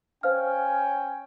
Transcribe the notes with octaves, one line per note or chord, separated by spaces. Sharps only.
C#4 C5 F5 G5 G#5 F6